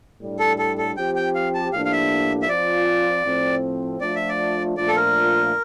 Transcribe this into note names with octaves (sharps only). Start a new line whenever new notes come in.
A2 G3 D4
A4
A4
A4
F3 C4 G4 G5
G5
F5
A5
A2 F3 A#3 D4 G4 F5
F5
E5
E5
F3 C4 F4 D5
A2 F3 C4
F3 A3 D4 F4 D5
E5
D5
A#2 F3 A3 D4 F4 D5
A4
A#4